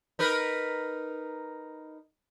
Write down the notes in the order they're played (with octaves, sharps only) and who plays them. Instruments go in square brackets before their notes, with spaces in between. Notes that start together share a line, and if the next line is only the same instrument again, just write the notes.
[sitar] D#4 A#4 B4